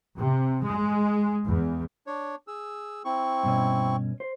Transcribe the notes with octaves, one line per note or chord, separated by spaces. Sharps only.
C3
G#3
E2
D4 C#5
G#4 E6
C4 E4 C#6
G2 B2 C#4
C5